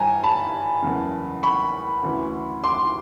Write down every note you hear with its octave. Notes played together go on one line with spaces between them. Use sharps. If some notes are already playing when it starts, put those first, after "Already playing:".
Already playing: G1 G2 E3 G5 G#5 A#5
A5 B5
F#1 E2 C#3
B5 C#6
D2 C#3 E3
C6 D6